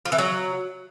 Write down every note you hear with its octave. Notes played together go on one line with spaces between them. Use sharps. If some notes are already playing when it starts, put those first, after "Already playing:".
F3
E3
F#3